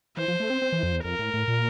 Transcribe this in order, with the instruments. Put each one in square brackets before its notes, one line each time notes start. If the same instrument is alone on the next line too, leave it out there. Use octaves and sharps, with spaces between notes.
[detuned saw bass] E3 [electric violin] C5
[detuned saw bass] F3
A3
C4
C4
E3
F2
E2
[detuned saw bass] F2 [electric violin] A#4
[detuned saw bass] A2
A2
A#2